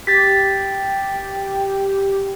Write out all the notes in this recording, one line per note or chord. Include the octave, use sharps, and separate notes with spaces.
G4 A6 B6